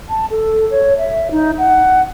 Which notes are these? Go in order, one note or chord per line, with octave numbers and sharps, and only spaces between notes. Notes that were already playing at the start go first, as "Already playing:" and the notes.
A5
A4
C#5
E5
D#4
F#5